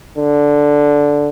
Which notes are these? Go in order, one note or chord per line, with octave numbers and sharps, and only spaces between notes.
D3